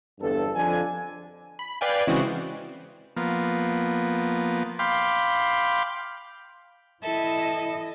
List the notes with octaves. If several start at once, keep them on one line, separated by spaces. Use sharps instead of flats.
G1 E2 G2 C4 A4
F2 D3 G#5
B5
B4 D5 F5 G5 G#5
C#3 E3 G#3 C4 F#4
F3 A#3 B3
F5 G5 B5 C6 D6
E3 E4 A4 D#5 E5